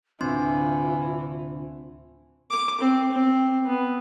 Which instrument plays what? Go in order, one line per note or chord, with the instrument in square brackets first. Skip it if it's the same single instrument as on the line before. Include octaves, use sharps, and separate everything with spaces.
[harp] D2 A2 C3 [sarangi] E3 [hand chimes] C4 D4 C6 [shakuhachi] F4
[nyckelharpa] D6
C4
C4
B3